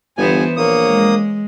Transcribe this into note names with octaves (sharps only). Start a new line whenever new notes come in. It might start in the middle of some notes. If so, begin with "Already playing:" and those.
G1 E3 B3 C5 G#5
A#1 A#3 C#5 D#6
G#3